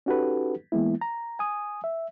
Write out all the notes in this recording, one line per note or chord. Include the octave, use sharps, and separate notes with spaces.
C#4 D#4 F#4 G4 A4 B4
E3 G#3 A#3 B3 E4
A#5
G#5 D#6
E5